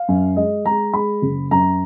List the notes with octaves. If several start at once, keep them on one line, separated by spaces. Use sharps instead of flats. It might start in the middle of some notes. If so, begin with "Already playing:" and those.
Already playing: F5
F#2
G#3 D#5
G#3 A#5
G#3 B5
F#1
F#2 A#5